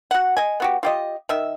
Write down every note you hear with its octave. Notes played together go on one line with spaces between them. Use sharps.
F#4 F#5
D#5 G#5
B3 F#4 G4
F4 G4 D#5
D#3 E5